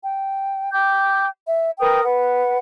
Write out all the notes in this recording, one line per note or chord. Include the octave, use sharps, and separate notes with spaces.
G5
G5 D6 G6
E5
A#4 B4 G5 D#6
B4 F#5